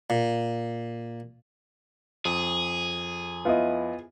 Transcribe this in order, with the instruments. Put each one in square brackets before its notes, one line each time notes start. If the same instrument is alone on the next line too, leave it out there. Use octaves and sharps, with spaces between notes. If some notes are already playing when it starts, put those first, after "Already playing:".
[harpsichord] A#2
[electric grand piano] F2 [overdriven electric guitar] G#4 [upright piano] D#6
[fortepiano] B3 E4 [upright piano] F4 D#5